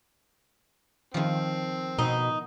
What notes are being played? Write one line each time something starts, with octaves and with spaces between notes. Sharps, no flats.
D#3 F3 C4
B2 D#4